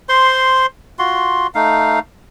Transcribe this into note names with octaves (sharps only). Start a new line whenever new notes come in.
C5 C6
F4 F#4 C6
A3 D#4 F5